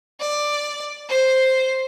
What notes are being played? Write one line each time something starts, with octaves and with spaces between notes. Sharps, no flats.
D5
C5